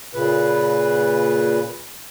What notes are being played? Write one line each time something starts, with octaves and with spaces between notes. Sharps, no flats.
A#2 C#3 B4